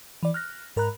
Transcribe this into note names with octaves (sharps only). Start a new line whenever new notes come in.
E3 D5
F6 F#6 A#6
G#2 A#4 A#5 B5 F#6